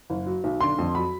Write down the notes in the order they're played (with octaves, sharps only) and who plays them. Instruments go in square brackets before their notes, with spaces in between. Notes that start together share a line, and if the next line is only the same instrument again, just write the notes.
[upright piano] F#1
F#3
B1
D3 C6
F2
F#3 B5